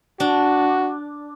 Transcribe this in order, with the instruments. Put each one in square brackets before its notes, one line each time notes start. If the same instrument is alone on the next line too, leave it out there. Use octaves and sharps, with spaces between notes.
[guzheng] D4 [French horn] F#4